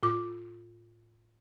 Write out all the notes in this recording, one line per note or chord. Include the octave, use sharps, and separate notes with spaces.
A2 F4 D6